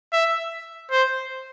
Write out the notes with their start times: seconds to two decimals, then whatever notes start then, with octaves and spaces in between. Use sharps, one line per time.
0.13 E5
0.91 C5